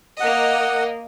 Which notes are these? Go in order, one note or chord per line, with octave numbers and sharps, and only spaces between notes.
A#3 D#5 F#5